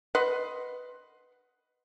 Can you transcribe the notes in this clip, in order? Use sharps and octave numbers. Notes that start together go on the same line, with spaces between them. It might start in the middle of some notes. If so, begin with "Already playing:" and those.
B4 D#5 F#5 C6